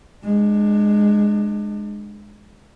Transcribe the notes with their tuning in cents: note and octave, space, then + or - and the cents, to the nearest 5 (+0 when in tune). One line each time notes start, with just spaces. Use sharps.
G#3 +0 D4 +30